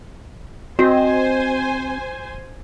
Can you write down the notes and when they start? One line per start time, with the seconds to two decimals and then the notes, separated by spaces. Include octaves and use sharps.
0.79 C4 F#4 C5 D#5 G#5